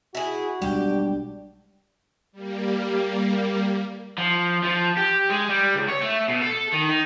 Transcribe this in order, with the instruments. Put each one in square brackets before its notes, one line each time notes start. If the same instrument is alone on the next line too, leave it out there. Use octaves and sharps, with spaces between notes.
[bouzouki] E4 G#4 [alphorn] F#4
[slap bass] B1 G3 G#3 [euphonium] D4 [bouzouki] G4
[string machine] G3 A#3
[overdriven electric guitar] F3
F3
G4
G#3
G3
C#2
C#5
A3
B2
A4
D#3
D#4